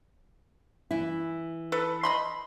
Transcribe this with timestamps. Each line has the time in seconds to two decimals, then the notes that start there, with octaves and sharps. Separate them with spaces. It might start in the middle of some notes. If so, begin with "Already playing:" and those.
0.91 E3 E4
1.72 A4 B4
2.03 D#5 B5 C6